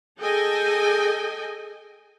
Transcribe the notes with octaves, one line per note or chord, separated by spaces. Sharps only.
G#4 A4 D#5 G5 G#5